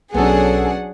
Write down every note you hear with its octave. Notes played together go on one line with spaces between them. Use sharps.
B1 F#3 B3 C#4 D4 G#4 A4 F#5